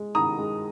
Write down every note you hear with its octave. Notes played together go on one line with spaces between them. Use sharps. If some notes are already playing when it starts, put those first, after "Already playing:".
Already playing: G#3
D#3 A#5 D#6
G#3